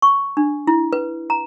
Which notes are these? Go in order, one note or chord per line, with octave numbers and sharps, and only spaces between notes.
C#6
D4
E4
B4
A#5